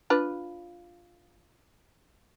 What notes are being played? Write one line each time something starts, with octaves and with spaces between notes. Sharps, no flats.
D4 F4 B4